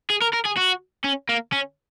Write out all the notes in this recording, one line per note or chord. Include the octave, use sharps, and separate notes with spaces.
G#4
A#4
A#4
G#4
F#4
C#4
A#3
C#4